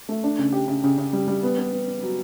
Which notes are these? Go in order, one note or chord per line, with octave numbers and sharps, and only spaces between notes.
A3
D4
C#3
G4
C#3
C#3
C#3
G3
G3
B3
B3
B3
B3
F#3